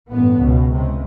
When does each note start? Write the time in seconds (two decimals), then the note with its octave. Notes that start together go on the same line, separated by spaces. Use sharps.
0.11 A1 G2 B3
0.40 C#2 B2
0.70 C#2 C3